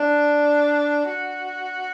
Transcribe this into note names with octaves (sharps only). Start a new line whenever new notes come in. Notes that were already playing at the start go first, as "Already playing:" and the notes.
Already playing: D4
F#4